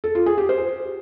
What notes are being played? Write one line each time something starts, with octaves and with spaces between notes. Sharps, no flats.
A4
F4
G#4
G4
C5